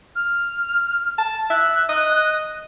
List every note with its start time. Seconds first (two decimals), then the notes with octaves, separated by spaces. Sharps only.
0.15 F6
1.18 A5
1.50 E5 F#6
1.89 D#5